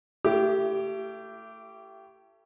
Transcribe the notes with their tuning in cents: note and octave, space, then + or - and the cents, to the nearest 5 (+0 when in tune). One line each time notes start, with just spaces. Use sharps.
A3 +15 E4 +35 G4 -15